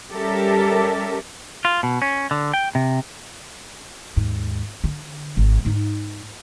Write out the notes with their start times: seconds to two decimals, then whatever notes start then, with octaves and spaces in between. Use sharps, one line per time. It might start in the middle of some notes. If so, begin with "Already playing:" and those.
0.12 G3 C#4 G4 A4 A#4 E5
1.65 F4
1.83 B2
2.02 C#4
2.31 D3
2.54 G5
2.75 C3
4.16 D#2 G#2
4.84 D3
5.37 G#1
5.65 G#2 D#4